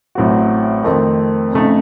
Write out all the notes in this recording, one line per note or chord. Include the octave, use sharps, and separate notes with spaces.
A1 A2 F#3 C4 F#4
F2 D#3 A3 C4
F2 C#3 A3 D#4